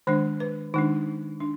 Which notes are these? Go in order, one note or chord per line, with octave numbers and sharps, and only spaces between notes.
D#3 G#3 D4 C5
B4
D#3 G#3 D4 D#4
D4